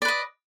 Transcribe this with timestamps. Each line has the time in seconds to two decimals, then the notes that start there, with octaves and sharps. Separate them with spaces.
0.02 D5
0.05 B4
0.08 D#5